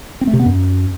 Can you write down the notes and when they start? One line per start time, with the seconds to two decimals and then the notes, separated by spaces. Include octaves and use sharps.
0.21 C4
0.27 A3
0.33 C3
0.39 B3
0.46 F#2